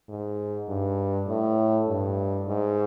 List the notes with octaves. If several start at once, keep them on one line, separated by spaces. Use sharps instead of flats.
G#2
G2
A2
G2
G#2